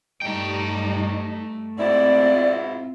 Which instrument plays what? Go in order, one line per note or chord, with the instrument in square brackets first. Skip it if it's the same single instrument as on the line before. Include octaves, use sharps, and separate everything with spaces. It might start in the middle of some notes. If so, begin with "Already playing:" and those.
[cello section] G2 G3 D#4 [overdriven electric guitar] A3 G5
[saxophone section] G#2 B2 E4 [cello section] C4 F4 [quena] D5